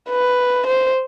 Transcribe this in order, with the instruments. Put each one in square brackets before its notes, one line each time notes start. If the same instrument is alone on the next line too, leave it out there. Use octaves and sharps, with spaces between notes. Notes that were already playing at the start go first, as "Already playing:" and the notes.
[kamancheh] B4
C5